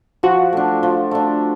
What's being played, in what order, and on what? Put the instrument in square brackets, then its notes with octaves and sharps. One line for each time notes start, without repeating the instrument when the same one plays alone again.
[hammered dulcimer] F3 [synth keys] F#4
[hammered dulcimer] A3 D4
F3
A3 D4